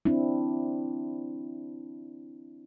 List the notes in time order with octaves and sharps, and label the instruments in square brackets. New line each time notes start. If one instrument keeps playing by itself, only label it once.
[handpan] C4 D4 E4